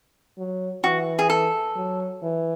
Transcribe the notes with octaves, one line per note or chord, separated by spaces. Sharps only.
F#3
E3 F#4
G#4
A4
F#3
E3